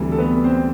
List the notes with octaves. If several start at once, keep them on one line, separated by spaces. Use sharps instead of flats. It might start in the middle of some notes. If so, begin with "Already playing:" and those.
Already playing: D2 C3 E3 G3
A4
B3 B4
C4 C5